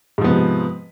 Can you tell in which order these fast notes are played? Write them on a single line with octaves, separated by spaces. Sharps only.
G#2 F3 B3 C3